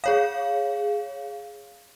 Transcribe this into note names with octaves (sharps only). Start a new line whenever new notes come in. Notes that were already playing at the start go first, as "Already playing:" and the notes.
G#4 C#5 F5